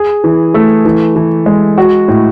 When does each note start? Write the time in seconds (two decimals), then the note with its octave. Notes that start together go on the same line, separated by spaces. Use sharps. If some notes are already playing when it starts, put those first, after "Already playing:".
Already playing: G#4
0.24 E3
0.54 A3
0.85 E3
1.16 E3
1.46 G#3
1.78 F#4
2.08 A2